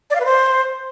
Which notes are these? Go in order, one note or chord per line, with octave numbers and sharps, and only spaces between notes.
D5
F5
B4
C5